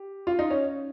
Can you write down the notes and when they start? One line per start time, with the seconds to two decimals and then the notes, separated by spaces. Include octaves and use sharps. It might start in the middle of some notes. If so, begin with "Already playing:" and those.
Already playing: G4
0.27 F4
0.39 D#4
0.51 C#4